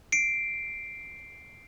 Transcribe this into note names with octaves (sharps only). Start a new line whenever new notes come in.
C7 D7